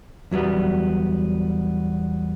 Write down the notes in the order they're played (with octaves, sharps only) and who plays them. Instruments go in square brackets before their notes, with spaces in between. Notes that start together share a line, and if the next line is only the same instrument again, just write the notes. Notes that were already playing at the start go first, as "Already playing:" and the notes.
[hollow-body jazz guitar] E2 F#3 G3 B3